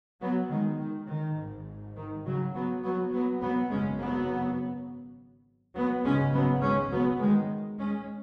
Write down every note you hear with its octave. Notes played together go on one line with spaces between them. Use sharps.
F#3 B3
D#3 G#3
D#3
D#3
G#1 G#2
D#3
C#3 F#3
F#3 B3
F#3 B3
F#3 B3
F#3 B3
G#1 F#2 C#3 G#3 C#4
F#3 B3
F#3 B3
G#1 F#2 C#3 G#3 C#4
F#3 B3
G#3 C#4
F#3 B3
D#3 G#3
G#3 C#4